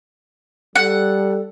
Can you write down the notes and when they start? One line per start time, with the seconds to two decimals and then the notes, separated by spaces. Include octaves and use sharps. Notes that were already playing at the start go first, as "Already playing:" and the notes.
0.75 G3 A4 F#5